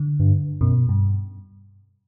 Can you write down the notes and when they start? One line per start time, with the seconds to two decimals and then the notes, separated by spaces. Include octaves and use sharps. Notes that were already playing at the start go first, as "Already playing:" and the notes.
Already playing: D3
0.19 G2
0.61 F#2 B2
0.89 G2